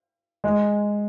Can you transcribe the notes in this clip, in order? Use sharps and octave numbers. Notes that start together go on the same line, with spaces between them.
G#3